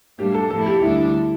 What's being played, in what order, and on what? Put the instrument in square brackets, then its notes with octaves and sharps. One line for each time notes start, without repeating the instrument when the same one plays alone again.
[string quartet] A2 G3 A#3 D4 [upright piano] G4
[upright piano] A4
[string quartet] A2 F3 A#3 E4 [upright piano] A4
[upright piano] G4
[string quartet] D2 D3 G3 D4 [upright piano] E4